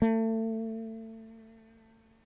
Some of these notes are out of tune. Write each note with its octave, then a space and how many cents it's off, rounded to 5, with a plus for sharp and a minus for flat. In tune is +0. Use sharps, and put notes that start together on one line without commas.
A3 +30